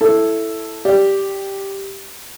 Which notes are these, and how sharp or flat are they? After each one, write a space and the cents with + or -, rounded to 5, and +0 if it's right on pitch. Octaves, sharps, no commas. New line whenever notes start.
E4 +0 A4 +0
G4 +0 D5 +0